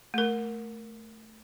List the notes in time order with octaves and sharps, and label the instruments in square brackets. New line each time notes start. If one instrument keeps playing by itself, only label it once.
[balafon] A3 A#4